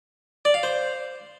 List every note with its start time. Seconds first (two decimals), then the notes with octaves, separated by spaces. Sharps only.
0.45 D5
0.54 F5
0.63 C5